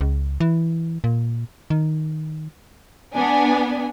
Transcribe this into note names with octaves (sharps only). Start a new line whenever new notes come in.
C#2
E3
A#2
D#3
B3 D4 G#5